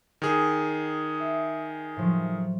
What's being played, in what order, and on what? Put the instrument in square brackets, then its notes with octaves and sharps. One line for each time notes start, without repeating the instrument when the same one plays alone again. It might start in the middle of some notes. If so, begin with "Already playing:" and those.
[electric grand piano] D#3 G#4
[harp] E5
A2 F3 F#3